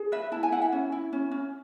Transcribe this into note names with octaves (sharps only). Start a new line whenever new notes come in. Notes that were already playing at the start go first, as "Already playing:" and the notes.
Already playing: G#4
B4 E5
E4 A5
G#5
E4 F#5
E5
C#4
E4
C#4
C#4